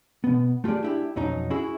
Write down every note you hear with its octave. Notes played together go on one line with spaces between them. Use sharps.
B2 B3
A3 F4 G4 G#4 D5
D4 E4 G4
B1 F2 F#3 C#4 D#4 A#5
C#4 E4 F#4 G#4 E5